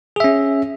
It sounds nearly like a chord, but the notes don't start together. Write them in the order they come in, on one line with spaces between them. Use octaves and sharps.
G#4 E5 C#4